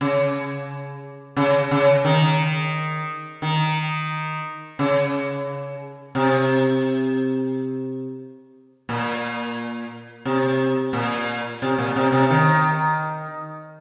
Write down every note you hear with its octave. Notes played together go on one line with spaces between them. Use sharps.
C#3
C#3
C#3
D#3
D#3
C#3
C3
A#2
C3
A#2
C3
A#2
C3
C3
D#3